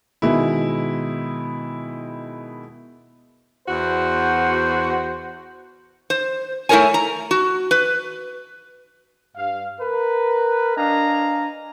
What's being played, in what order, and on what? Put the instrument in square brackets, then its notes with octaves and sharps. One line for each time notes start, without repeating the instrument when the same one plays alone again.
[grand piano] B2 D#3 G#3 E4
[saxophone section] E2 F#4 [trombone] C5
[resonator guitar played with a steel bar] C5
A3 E4 A4 A#4 C#5 G#5
A#5
F#4
B4
[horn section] G2 F5
A#4 B4
D4 D#5 F5 G#5 A#5